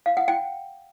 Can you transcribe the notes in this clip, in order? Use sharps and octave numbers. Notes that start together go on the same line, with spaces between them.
F5
F#5
G5